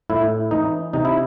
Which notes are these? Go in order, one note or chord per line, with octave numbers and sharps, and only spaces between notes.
A2 E4
E3 D#4
C3 D#4
E4